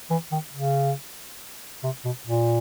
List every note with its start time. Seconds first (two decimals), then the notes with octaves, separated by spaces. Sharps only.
0.10 E3
0.31 D#3
0.53 C#3
1.83 C3
2.05 B2
2.27 A#2